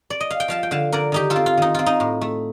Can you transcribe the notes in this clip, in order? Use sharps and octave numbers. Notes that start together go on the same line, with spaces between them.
D5
D#5
F5
G5
F3 F5 A5
G5
D3 F5 A5
D3 A#4 D5
D#3 D#4 G4
F4 A4
C4
F4
D#3 D#4
C4 F4
D#4
A2
A3